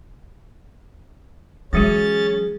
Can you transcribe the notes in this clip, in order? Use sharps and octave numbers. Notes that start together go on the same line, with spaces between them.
E3 F#3 G#3 C#4 F#4 G#4 A6